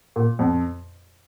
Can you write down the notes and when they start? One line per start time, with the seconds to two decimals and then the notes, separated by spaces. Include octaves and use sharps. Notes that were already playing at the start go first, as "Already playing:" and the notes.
0.16 A#2
0.39 F2